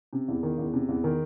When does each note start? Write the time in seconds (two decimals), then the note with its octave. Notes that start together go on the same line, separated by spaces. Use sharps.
0.13 C3
0.28 E2
0.43 D#3
0.58 E2
0.73 C3
0.89 E2
1.04 D#3